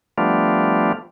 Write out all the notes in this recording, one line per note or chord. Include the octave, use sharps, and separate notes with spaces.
F3 G3 A3 B3 D4 F4